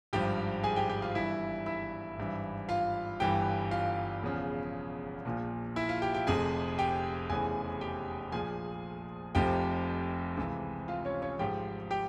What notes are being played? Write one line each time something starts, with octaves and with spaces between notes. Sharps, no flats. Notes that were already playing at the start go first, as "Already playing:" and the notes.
G#1 G2 F3 G4 G5
G#4 G#5
G4 G5
G4 G5
F4 F5
G1 G2 E3 E4 E5
E4 E5
G#1 G2 E3
F4 F5
G1 G2 E3 G4 G5
F4 F5
E1 E2 C#3 F3
A#1 A#2 F3
E4 E5
F4 F5
G4 G5
G4 G5
F1 F2 C3 G#4 G#5
G4 G5
F1 E2 C#3 E3 G#4 G#5
G4 G5
A#1 A#2 F3 G#4 G#5
F1 F2 C3 F3 G4 G5
C#2 C3 E3
F4 F5
C#4 C#5
C#4 C#5
G#1 G#2 F3 G4 G5
G4 G5